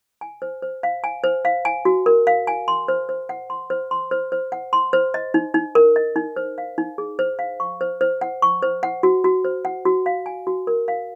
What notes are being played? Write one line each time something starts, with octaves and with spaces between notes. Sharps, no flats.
G#5
C5
C5
F5
G#5
C5
F5
G#5
F#4
A#4
F5
G#5
C6
C5
C5
F#5
C6
C5
C6
C5
C5
F#5
C6
C5
D#5
D#4
D#4
A#4
D#5
D#4
C5
F5
D#4
G#4
C5
F5
C#6
C5
C5
F#5
C#6
C5
F#5
F#4
F#4
C5
F#5
F#4
F5
G#5
F#4
A#4
F5